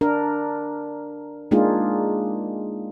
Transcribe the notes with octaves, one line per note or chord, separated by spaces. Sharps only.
D4 A#4
G#3 A#3 D4 D#4 F4 G#4